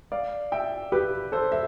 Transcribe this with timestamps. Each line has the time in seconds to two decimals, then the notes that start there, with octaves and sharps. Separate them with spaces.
0.12 D5 F5
0.52 E5 G5
0.92 G4 B4
1.32 A4 C5
1.52 E5